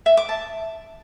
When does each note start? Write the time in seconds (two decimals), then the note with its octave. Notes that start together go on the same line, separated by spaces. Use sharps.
0.06 E5
0.17 D6
0.29 A5